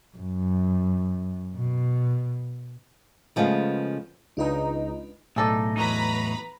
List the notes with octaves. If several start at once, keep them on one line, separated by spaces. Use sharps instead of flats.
F#2
B2
C#3 F3 G#3 A3 B3 F4
C#2 D4 D#4 F4 B4
B1 A2 D#4 G#4 A4 D5
E2 F#3 D#4 B4 A#5 B5